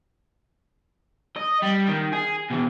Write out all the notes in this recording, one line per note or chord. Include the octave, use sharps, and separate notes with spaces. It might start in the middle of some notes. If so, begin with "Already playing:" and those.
D#5
G3
D#3
G#4
B2 E3